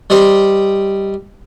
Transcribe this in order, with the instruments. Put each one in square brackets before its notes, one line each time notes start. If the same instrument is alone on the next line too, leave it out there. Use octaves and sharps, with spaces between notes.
[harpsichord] G3 D#4 G4 C5